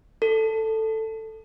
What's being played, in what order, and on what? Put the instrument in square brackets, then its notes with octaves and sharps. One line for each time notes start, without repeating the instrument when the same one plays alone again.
[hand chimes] A4